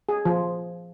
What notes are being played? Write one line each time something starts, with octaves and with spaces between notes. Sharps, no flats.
G#4
F3